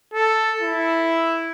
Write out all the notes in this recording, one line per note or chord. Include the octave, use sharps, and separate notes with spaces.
A4
E4